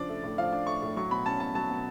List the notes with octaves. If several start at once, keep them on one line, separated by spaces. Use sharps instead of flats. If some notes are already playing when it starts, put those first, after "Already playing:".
Already playing: C#3 F3 D4 D5
A3
A2
F3 F5
D4
A3 C#6
A2
F#3 C#6
B2 B5
C#4 A5
B2 A5
F#3 A5
B2